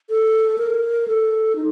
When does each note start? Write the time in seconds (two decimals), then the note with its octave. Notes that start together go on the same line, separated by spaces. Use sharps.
0.10 A4
0.58 A#4
1.08 A4
1.56 D#4